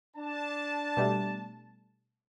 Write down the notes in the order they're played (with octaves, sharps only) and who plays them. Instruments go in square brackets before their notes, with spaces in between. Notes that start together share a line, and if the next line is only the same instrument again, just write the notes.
[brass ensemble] D4 A5
[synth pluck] B2 G3 A3